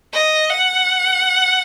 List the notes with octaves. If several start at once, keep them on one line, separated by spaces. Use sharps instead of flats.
D#5
F#5